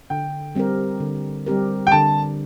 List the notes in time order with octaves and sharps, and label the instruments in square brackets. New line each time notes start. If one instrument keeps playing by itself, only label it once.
[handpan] D3 [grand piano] G5
[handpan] G3 C4 G4 A#4
D3
G3 C4 G4 A#4
[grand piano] G5
[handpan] D3 [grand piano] A5